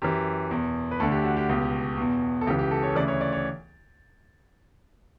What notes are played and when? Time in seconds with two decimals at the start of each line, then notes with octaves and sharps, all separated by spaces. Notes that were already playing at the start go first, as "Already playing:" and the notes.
0.02 F#2 E3 G4
0.51 E2 B2
0.91 B4
1.00 D2 D3 A4
1.12 G4
1.24 F#4
1.37 G4
1.49 C#2 B2
1.98 E2 B2
2.41 A4
2.47 C#2 C#3 E3 G4
2.59 G4
2.71 A4
2.83 C#5
2.96 D2 C#3 E3 D5
3.08 C#5
3.21 D5
3.33 C#5